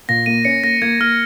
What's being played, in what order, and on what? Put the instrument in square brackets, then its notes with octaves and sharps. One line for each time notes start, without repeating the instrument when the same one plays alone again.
[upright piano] A#2 [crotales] A#6
[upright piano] A#3 [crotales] D#7
[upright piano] C#4 [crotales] C#7
[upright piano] A#3 [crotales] A#6
[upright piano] A#3 [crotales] G#6
[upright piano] A#3 [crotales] F6